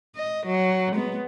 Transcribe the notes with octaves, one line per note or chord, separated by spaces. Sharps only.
D#5
F#3
G#3 B3